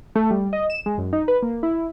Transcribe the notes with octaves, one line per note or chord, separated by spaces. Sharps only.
A3
G3
D#5
E7
G#3
F#2
D#4
B4
A#3
E4